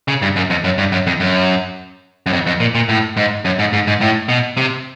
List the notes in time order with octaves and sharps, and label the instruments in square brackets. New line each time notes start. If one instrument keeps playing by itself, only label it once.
[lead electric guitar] C#3
G2
F#2
F2
F#2
G2
F#2
F2
F#2
F#2
F2
F2
A#2
A#2
A2
G#2
F#2
G#2
G#2
G#2
A2
B2
C3